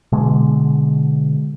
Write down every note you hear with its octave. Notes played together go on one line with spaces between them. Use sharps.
B2 D3 G#3